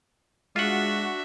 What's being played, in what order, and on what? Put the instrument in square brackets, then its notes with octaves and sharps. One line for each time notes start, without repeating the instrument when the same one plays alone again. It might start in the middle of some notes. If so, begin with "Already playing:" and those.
[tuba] G#3 [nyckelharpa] D4 E5 [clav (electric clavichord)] F4 F#5 [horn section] F#4